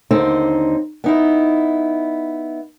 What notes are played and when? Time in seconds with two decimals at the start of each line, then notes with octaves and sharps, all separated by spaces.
0.11 D#2 D3 C4 D#4 C5
1.04 B3 D#4 E4